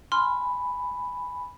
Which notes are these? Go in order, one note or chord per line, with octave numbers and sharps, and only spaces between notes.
G#5 B5 C6 F6